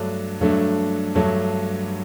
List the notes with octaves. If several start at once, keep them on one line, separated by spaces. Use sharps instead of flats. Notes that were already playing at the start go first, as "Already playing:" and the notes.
Already playing: G2 F#3 A3 D4
G2 F#3 A3 D4
G2 F#3 A3 D4